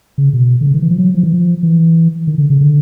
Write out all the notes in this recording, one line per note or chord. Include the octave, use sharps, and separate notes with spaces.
C#3
B2
D3
C#3
D#3
E3
F3
F#3
F3
E3
F3
E3
D#3
D3
C#3
D3